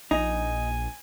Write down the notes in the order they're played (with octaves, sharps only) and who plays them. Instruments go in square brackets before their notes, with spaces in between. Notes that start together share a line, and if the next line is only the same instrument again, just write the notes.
[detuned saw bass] A#1 [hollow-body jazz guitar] D#4 [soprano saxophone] G#5